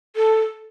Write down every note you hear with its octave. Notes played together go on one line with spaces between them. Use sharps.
A4